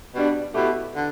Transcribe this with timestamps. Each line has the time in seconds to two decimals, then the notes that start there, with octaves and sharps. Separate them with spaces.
0.14 B2 G3 D4
0.54 B2 A3 E4 G4
0.94 D3